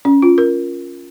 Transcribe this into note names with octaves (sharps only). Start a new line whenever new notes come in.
C#4
F4
A#4